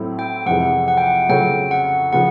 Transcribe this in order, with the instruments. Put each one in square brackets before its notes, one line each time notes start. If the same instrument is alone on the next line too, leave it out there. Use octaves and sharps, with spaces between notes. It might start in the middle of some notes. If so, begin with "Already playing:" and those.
Already playing: [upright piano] A2 F#3 A3 C4 E4
[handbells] G5
[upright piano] F2 C3 E3 G#3 [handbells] F#5
[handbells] F#5
G5
F#5
[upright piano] C#3 F#3 A3 C#4 F4 [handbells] G5
[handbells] F#5
[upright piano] C#3 F3 [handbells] F#5